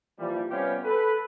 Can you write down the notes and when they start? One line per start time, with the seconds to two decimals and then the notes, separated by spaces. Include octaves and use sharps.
0.19 A#2 E3 F3 G3
0.50 C3 G3 B3 C#4 F4 G4
0.84 A4 B4